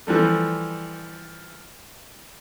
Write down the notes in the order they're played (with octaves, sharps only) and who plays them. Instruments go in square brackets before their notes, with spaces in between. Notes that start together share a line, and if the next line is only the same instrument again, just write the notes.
[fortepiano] E3 F3 G3 A3